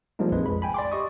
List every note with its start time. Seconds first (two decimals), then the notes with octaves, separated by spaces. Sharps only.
0.19 F3 G3 G#3 A#3 D#4
0.32 A#1 F2 G#3 B4
0.46 B5
0.62 G5 G#5 B5
0.74 D5 C6 D6
0.92 G4 D#5 C#6 D#6